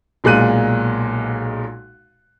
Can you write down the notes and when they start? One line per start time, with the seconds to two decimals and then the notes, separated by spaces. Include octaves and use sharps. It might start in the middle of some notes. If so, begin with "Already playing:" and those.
0.24 B1 A#2 G#3 F#6 D#7